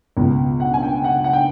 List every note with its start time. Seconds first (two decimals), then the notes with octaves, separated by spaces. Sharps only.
0.17 C#2 B2
0.60 F#5
0.74 G#5
0.83 G5
1.04 F#5
1.24 F#5
1.33 G5